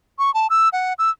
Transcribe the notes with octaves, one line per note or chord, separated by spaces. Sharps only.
C#6
A5
E6
F#5
E6